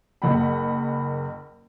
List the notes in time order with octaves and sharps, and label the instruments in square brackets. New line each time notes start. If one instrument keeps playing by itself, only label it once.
[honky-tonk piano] F#1 A#4 F#5 G5 B5